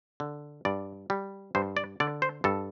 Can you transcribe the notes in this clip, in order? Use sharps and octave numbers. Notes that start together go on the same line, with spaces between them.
D3
G2 D5
G3
G2 C5
D5
D3 D5
C5
G2 A4